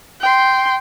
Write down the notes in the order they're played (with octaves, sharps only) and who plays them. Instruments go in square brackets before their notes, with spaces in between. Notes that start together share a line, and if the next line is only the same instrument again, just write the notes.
[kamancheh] G5 C6